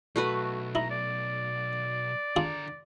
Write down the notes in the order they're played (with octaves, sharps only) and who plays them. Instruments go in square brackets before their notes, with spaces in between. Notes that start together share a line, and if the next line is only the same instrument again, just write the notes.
[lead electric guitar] B1 [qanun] A3 F#4 B4
[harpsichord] D#4 E4 [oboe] A#5
[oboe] D5
[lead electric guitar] D3 A#5 [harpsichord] D4 F4 G#4